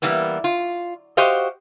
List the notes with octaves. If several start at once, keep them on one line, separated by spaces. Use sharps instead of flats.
E3 G3 A#3 B3
F4
F#4 G4 C5 D#5 F5